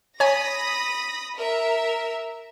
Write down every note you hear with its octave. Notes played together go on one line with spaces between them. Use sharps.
C#5 G#5 B5 D#6 A#6
A#4 E5